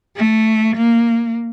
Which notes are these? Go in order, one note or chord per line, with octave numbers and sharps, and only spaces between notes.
A3
A#3